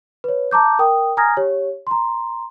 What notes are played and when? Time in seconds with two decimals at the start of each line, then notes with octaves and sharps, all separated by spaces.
0.24 B4 C#5
0.51 A5 A#5 D6 G6
0.79 A#4 G5 D#6
1.17 G#5 A#5 D#6 F6 G#6 A#6
1.37 G4 C#5
1.87 A#5 C6